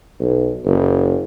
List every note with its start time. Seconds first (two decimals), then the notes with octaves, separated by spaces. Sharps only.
0.20 B1
0.65 F#1